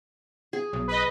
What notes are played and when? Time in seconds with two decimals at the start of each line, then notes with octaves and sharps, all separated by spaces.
0.53 G#4
0.73 B1
0.87 B4 D#5